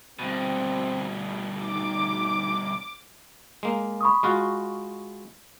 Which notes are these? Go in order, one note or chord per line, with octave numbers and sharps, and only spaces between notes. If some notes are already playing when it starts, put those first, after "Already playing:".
G2 B2 C4
D#4 D6
G#3 A#3
B5 C#6 D#6
G#3 F4 F#4